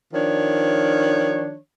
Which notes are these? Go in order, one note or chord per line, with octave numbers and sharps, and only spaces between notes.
D#3 F3 D4 C#5